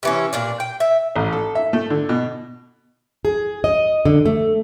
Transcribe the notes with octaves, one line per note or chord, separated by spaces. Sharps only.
C3 E3 C#4
A#2 D4 D5
G5
E5
A1
A4
E5
A3
D3
B2
G#4
D#5
D3
A3